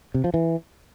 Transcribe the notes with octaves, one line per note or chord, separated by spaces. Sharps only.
C3
F3
E3